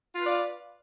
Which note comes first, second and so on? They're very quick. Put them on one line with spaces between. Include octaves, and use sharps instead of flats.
F4 B4 D5 F5